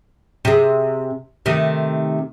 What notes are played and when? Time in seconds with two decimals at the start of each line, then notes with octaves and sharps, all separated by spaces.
0.45 C3 G#4
1.46 C3 D#3 A3